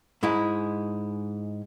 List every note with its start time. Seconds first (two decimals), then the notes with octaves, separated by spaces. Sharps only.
0.23 G#2 G#3 E4